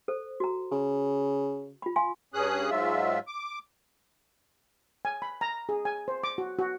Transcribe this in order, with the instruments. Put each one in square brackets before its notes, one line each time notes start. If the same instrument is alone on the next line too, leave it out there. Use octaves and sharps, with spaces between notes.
[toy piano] A4 C5
F#4 A#5
[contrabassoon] C#3
[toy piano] F4 B5
F5 G#5 C6
[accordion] G2 C#4 G#4 D#6 F#6
G#2 F#3 G#3 F4 E5
D6
[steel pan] G#5
B5
A#5
G#4
G#5
C5
D6
F#4
F#4